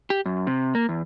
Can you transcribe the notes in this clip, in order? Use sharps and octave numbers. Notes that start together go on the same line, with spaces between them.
G4
F#2
C3
A#3
E2